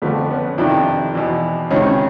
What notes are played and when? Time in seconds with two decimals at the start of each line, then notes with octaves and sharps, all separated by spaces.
0.02 F2 D3 F3 A3 B3
0.30 B3 C#4
0.58 F2 C3 D#3 D4 E4
1.15 E2 B2
1.70 C#2 C3 D#3 C#4 D#4